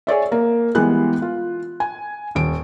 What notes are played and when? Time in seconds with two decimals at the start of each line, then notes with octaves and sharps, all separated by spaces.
0.07 G#4 C#5 D5 E5
0.32 A#3
0.75 E3 G3 G#3 B3 G4 F#6
1.22 F4
1.80 G#5
2.35 D#1 D7